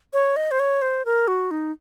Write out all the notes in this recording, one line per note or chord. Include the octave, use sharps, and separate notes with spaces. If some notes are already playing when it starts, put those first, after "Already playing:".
C#5
D#5
C5
C#5
C5
A#4
F#4
D#4